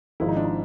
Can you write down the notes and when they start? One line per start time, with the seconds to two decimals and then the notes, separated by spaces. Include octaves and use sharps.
0.20 G#1 G#2 F3 E4
0.28 D#4
0.36 D4
0.45 D#4